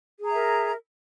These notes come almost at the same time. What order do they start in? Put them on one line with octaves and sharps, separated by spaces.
G#4 A#5 E5 A#4